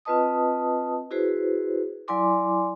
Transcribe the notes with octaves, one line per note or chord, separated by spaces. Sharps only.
C4 F4 B4 D#5 A5 D#6
E4 F#4 G#4 B4 C5
F#3 E4 D5 G#5 C6 D6